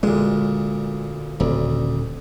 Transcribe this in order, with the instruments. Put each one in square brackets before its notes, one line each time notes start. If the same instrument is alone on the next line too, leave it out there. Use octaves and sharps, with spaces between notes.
[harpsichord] D2 A#2 [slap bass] G#3
[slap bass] D#1 [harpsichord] D2